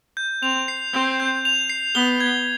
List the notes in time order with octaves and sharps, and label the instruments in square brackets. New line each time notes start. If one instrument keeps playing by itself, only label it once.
[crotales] G6
[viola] C4 [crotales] F7
[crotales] C7
[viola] C4 [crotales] G6
[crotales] G6
F7
C7
[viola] B3 [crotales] G7
[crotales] G#6